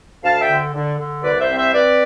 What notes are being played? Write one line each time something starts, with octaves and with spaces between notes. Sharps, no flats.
D2 F5 A5
E5 G5
D3
D3
D3
C2 B4 D5
C5 E5
C4
C5 E5
C4 B4 D5